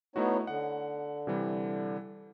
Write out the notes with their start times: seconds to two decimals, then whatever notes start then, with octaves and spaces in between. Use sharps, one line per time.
0.16 A3 B3 D#4 E4 F#4 C#5
0.47 D3 F#5
1.27 C3 E3 G3